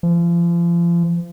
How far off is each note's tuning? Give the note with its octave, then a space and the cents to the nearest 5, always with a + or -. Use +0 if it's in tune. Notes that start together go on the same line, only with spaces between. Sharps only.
F3 -35